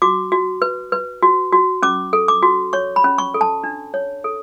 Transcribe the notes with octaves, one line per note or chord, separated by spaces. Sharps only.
F#4 D6
F#4
B4
B4
F#4
F#4
C#4 D6
A4
D6
F#4
C#5 C#6
B5
C#4
C#6
A4
A5
D4
C#5
A4